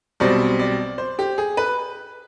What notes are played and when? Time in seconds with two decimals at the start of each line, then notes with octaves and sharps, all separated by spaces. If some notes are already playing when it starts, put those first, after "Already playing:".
0.20 B1 B2 G3 C4 D5
0.59 D5
0.98 C5
1.19 G4
1.38 G#4
1.57 B4